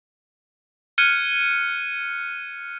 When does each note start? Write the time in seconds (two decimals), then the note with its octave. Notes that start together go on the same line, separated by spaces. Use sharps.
0.98 F6 F#6 G#6 C#7 D#7